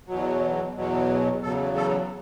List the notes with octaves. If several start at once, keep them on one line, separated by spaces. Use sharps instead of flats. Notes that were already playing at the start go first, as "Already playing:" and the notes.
E2 B2 F#3
E2 B2 F#3
E2 C#3 F#3 A4
A4